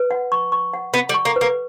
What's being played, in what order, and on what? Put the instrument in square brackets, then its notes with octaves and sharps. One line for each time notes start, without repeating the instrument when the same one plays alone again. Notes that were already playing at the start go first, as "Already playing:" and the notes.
Already playing: [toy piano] B4
F#5
C#6
C#6
F#5
[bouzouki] B3 [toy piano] F#5
[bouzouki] G3
[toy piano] C#6
[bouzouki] A#3
[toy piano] B4
[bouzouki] A#3